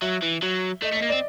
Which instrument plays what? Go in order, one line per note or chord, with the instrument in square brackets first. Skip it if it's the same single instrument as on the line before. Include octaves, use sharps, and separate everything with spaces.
[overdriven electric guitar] F#3 [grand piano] E5
[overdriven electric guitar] E3
F#3
[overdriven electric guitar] A3 [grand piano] D#5
[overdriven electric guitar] A3
[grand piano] D#5
[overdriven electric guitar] A#3
[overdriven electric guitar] C4 [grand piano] D5